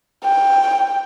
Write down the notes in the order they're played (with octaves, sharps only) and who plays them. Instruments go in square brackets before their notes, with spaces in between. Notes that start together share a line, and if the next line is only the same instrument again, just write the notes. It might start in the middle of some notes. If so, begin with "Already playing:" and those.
[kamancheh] G5